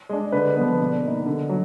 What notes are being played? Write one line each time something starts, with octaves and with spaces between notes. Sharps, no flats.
G#3 D4
D3 B4
F3 B3
B2 D5
A#3 D#4
D3
F#3